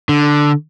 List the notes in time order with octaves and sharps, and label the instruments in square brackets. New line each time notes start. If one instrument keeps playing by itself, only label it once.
[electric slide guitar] D3